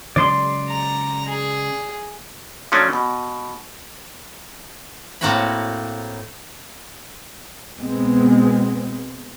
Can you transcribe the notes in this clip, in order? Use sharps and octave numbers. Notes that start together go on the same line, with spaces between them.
C#3 F#3 G#3 D5 C6
A#5
G#4
F3 F#3 A3 C#4 D4
B2
A2 A#3 C4 F#4 C#5 B5
B2 G#3 B3 C4